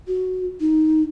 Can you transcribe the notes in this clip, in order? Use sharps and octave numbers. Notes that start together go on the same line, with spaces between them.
F#4
D#4